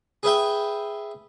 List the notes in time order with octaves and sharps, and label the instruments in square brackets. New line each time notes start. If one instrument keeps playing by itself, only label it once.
[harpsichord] G#4 B4 E5 G5